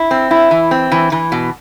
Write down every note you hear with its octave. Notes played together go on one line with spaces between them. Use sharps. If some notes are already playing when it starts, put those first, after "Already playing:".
Already playing: E4
C4
E4
E3
C4
E3
E3
B2